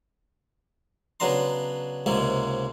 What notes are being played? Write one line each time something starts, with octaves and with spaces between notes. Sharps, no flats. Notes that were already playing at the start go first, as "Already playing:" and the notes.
C#3 F#3 B3 D4 A#5 C6
C#2 G#2 C3 G#3 A#3